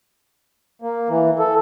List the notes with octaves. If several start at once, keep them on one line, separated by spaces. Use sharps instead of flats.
A#3
E3
A4